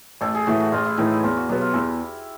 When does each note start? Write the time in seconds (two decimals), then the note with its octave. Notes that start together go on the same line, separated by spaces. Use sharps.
0.21 A1 A4
0.35 G#4
0.47 A2 E3 A3 F#4
0.60 F#4
0.72 A1 F4
0.85 E4
0.97 A2 E3 A3 D#4
1.11 E4
1.23 E2 F4
1.36 F#4
1.49 B2 F#3 B3 G4
1.61 F4
1.73 E2 E4